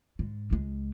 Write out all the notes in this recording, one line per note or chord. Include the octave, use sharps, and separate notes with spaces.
G#2
C#2 G#3